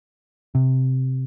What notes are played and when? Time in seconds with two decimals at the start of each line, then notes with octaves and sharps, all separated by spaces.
0.55 C3